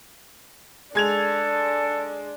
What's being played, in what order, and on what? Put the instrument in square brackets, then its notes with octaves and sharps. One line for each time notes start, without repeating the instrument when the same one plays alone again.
[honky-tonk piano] G#3 G#6 F7 [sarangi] D4 [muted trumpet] A4